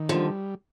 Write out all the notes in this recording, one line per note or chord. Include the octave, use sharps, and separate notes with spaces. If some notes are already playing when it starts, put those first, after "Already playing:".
Already playing: D#3
D3 F3
G3